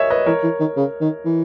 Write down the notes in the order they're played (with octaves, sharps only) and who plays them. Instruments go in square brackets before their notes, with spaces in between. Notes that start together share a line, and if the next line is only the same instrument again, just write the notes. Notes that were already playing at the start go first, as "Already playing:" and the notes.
Already playing: [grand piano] A#4 C#5 D#5 E5 G#5
B4 D#5
[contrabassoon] E3 [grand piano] A#4 C#5
[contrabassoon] E3
D#3
C#3
D#3
E3